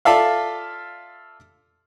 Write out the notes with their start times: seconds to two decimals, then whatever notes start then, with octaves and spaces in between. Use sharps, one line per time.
0.05 F4 A4 D5 E5 F5